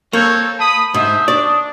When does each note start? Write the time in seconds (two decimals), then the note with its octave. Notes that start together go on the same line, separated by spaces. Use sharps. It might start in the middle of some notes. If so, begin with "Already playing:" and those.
0.13 A#3 C4 A4 C#5 C#6 G6
0.59 A5 B5 D#6
0.94 G#2 C5 E5 D#6
1.28 D4 D5 C#6 D7